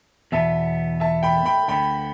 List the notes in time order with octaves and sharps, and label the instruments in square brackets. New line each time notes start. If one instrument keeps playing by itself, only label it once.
[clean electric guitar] E2 B2 B3 [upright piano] E5 A5
[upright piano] E5 A5
G5 B5
G5 B5
[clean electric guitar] D2 D3 B3 [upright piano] G5 B5